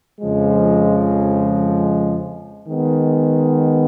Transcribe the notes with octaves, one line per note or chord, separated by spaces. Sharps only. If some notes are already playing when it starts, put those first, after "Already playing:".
F2 C#3 F3 G#3
D#3 G#3 B3